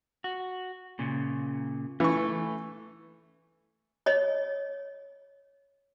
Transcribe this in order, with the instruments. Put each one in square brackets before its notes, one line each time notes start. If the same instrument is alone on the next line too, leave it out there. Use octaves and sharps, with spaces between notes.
[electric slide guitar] F#4
A#2 C#3
[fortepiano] E3 C#6 [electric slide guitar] A3
[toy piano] C#5 D#5